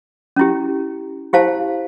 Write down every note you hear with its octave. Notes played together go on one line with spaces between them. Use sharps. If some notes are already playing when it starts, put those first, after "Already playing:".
C#4 E4 G4
E4 G4 C5 F5 A5